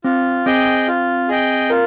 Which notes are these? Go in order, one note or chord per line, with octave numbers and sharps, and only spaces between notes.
C4 F4
C4 G#4 D#5 G5
F4
G#4 D#5 G5
F4 A#4